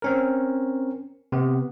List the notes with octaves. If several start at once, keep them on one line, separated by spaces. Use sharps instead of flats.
C4 C#4 A#4
C3 B3